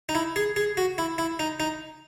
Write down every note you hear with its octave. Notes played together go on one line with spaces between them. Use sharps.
D#4
E4
G#4
G#4
F#4
E4
E4
D#4
D#4